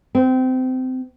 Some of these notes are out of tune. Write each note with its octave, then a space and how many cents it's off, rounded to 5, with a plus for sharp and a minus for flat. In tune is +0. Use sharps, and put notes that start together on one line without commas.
C4 -25